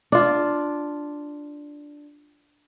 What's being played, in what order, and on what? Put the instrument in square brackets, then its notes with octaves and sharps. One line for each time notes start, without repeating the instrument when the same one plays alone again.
[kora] D4 F4